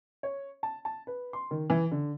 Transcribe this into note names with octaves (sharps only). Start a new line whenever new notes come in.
C#5
A5
A5
B4
C6
D#3
E3
D3